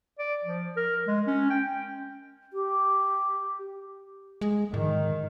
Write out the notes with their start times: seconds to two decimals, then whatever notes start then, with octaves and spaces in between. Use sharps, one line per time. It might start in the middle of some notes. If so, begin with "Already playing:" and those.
0.19 D5
0.44 F3
0.77 A#4
1.07 G#3
1.27 C#4
1.50 G5
2.53 G4
4.41 G#3
4.74 G#2 D#3